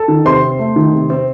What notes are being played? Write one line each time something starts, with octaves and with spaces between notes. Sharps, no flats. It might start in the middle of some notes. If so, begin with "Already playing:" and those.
Already playing: A4 A5
D#3
C3 C5 C6
C4
A3
D#3
C3
C4